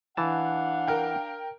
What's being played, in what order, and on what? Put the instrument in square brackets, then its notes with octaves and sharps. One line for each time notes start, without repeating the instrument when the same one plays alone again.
[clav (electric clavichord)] E3 A5 [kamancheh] D4 F5 [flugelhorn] F#5
[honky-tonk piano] A#4 G5